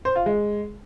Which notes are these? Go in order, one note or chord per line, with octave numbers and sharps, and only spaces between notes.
C5
F4
G#3